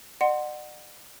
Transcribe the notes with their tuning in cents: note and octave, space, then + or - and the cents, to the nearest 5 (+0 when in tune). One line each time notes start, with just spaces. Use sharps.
D5 +45 F#5 +0 C6 +0